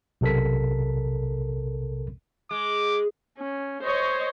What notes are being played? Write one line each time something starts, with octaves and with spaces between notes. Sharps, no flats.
B1 C3 A4 A#4 B6
G#3 D6
C#4
C5 C#5 D#5